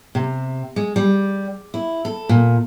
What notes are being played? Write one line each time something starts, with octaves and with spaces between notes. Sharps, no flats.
C3
G#3
G3
E4
A4
A#2